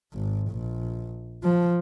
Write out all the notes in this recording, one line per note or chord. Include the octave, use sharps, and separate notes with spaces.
G#1
A#1
F3